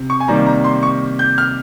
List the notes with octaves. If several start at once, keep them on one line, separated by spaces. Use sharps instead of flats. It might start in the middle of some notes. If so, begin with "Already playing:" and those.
Already playing: C3
C#6
G#5
C3 D#3 G3 A#3 A#5
A#5
C6
C#6
G6
F6